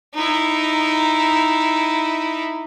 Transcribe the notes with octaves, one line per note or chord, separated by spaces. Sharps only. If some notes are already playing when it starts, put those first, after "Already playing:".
D#4 E4